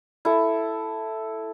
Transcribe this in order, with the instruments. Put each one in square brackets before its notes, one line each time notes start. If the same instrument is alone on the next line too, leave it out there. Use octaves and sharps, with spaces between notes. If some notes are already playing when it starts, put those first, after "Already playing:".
[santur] E4 A4